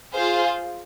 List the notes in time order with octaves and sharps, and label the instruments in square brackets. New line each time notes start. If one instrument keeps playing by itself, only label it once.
[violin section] F4 G#4 C5 F5